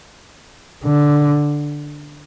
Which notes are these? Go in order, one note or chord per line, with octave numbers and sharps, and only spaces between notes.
D3